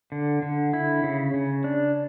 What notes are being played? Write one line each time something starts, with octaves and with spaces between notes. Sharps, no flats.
D3
D3
E4
C#3
C#3
D4